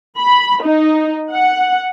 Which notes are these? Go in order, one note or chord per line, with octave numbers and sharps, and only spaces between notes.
B5
D#4
F#5